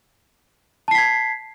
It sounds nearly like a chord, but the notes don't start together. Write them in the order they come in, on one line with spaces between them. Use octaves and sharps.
A5 C7 B6 G#6